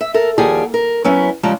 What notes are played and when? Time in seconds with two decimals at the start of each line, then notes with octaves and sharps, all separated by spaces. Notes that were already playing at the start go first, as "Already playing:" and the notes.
0.01 E5
0.14 A4 A#4
0.38 D#2 F3 G3 G4 G#4 F#5
0.74 A#4
1.04 F#3 B3 C#4 E4
1.43 C#3 F3 G3 G#3 A5 A#5